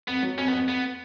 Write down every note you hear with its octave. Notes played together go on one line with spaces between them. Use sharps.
F2 B3
F#3
F2 C#4
B3
F2
F2 B3